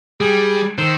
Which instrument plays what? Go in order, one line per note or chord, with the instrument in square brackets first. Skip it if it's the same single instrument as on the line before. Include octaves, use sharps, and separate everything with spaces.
[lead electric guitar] G3 [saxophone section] G#4
[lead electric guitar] D#3 [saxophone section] A4 C5